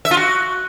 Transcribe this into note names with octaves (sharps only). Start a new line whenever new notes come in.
E5
F4
F#4